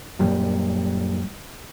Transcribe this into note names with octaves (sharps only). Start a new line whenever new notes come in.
F#2 A#2 G3